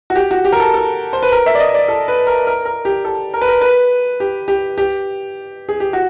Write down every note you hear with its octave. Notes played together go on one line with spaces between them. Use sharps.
F#4
G4
F#4
G4
A#4
A4
A4
C5
B4
A#4
E5
D5
D#5
D5
A4
B4
A#4
A#4
A#4
G4
A4
A#4
B4
A#4
B4
G4
G4
G4
G#4
G4
F#4